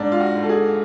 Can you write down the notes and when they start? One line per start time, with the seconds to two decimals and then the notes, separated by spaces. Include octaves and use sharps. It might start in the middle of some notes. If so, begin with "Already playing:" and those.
Already playing: G#2 D4
0.12 F4
0.20 F#4
0.35 G#2
0.43 A4
0.49 G#4